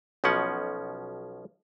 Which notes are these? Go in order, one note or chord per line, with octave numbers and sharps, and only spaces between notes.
B1 B2 F3 C#4 F#5